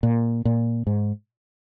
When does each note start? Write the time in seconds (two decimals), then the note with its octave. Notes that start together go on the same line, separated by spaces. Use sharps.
0.03 A#2
0.45 A#2
0.87 G#2